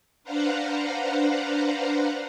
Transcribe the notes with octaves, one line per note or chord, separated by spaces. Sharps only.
D4 B4 C5 F5 F#5 A#5